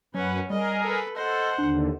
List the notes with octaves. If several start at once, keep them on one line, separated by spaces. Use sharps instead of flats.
F#2 F#3 C#4 B4 F#5
G3 G#4 A#4 D#5
A4 B4
A4 C5 D#5 F#5
D#2 D3 D4